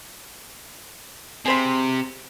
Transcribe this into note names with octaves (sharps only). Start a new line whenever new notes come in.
C3 G#4 C5 B5